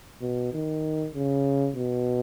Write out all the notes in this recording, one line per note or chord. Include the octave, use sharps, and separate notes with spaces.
B2
D#3
C#3
B2